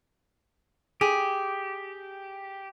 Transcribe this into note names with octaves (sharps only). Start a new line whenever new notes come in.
G4 G#4